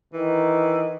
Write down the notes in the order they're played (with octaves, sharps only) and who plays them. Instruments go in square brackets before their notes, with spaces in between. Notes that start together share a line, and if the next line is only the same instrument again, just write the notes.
[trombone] D#3 [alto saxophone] E3